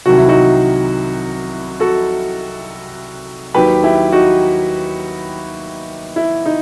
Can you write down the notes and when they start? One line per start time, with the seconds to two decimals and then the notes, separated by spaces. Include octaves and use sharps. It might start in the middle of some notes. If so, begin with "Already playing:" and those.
0.06 C2 C3 D#3 F#3 F#4
0.18 E4
0.29 D#4 F#4
1.80 F#4 A4
3.54 D#2 D#3 F#3 G4 B4
3.84 E4 G4
4.12 D#4 F#4
6.16 E4
6.46 D#4